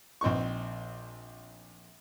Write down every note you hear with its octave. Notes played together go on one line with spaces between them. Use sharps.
A#1 C4 D#4 C#6